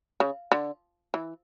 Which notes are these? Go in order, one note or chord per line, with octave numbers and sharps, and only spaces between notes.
C#3
D3
E3